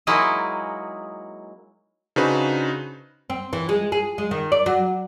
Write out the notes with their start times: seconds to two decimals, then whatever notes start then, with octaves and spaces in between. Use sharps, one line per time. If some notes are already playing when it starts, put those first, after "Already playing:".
0.07 F#3 G#3 A#3 D#4 E4 G#4
2.16 C#3 D4 D#4 F#4 B4 C5
3.30 C4
3.53 E3
3.69 G#3
3.92 G#4
4.18 G#3
4.31 D#3
4.52 D5
4.66 F#3